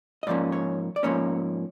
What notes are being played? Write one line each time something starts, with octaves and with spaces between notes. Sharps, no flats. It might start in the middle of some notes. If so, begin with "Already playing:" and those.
D#5
G#2 F3 A#3 C#4 D5
C#5
D5
G#2 F3 A#3 C#4 C#5